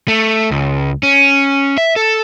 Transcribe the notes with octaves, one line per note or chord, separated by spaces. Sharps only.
A3
C#2
C#4
E5
A4